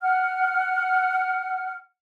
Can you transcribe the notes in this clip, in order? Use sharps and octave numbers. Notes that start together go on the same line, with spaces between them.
F#5 F6